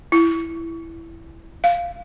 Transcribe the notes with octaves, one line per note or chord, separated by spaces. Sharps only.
E4
F5